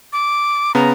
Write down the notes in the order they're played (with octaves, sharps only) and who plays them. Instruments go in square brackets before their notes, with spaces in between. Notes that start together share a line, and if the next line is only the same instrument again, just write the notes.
[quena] D6
[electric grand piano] C#3 B3 [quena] A#5